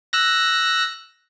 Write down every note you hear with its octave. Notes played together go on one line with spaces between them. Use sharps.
E6 F#6 A#6